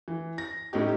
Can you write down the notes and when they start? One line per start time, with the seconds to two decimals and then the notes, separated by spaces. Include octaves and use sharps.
0.08 E3
0.38 A#6
0.73 A2 C#4 D#4 G4